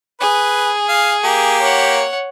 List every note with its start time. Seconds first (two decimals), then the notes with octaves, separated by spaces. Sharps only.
0.20 G#4 B4
0.89 F5
1.24 A#3 G4
1.61 C#5 F#5